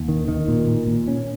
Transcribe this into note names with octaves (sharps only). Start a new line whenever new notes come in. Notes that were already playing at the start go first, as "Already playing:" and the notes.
Already playing: D#2
D#3
D#3
A#2
A#2
A#2
C#4